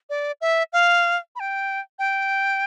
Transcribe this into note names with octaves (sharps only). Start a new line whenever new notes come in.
D5
E5
F5
B5
G5
G5